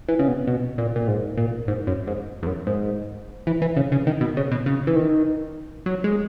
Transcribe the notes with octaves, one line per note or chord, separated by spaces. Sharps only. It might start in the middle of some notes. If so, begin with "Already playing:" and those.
E3
C#3
B2
B2
A#2
A#2
G#2
A#2
G#2
F#2
G#2
E2
F#2
G#2
E3
E3
C#3
C#3
D#3
B2
C#3
B2
C#3
E3
D#3
F#3
G#3